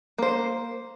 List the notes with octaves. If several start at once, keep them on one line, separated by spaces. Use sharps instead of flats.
A#3 C5